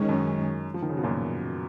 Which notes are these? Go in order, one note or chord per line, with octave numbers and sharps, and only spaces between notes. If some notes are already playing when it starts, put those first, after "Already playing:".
Already playing: D#3 G#3 C#4
F#2
F3
D#3
C#3
B2
F#2 A#2